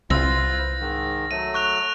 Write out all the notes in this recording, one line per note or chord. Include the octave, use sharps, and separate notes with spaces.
C2 F4 B4 C5 E6 A#6
G#2 D#3
F#3 A3 D#7
C#6 F#6 F7